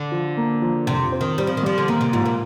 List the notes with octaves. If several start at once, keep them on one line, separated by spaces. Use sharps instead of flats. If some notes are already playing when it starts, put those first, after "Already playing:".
Already playing: D3
F3
A#3
F3
F2 C3
C4
D#3
G3 C4
F3
D#3
F3 G3
D3
D#3 A#3
C3
G#2 F3
A#2